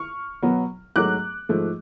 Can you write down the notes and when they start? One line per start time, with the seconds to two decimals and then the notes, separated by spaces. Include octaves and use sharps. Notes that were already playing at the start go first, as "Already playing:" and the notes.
Already playing: C#6 F6
0.43 B2 F#3 B3
0.96 G#2 F#3 A3 D6 F#6
1.49 G#2 F3 A3